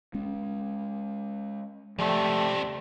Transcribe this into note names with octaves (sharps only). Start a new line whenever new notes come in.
G#3 C#4
C#2 C3 F3 G3 A3